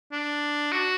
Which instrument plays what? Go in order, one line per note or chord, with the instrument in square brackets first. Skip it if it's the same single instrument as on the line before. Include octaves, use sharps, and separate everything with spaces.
[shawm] D4
F#4